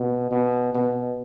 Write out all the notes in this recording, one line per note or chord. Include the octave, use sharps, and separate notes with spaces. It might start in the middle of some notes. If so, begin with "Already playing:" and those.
Already playing: B2
B2
B2